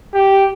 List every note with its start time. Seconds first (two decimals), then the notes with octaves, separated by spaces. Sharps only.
0.14 G4